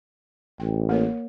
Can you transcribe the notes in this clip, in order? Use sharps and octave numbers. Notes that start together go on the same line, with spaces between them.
A1 G5
A#3 A#4 C#5